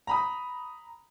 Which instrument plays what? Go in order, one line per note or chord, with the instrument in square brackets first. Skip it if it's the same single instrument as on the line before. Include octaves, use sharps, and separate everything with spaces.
[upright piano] A#5 B5 D#6